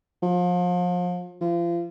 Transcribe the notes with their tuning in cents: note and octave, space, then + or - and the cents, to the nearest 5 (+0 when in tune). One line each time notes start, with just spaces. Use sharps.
F3 +35
F3 -35